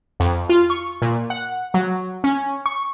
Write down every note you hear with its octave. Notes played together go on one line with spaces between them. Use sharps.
F2
F4
C#6
A#2
F#5
F#3
C#4
C#6